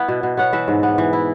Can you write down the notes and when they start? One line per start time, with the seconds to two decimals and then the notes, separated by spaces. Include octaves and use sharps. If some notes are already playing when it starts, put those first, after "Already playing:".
Already playing: B3 E4
0.08 B2
0.23 B2
0.37 B3 C#5 F#5
0.53 E3 B4 E5
0.68 G#2
0.83 B3
0.98 E3
1.13 E4